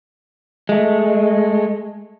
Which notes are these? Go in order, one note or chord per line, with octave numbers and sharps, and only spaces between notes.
G#3 A3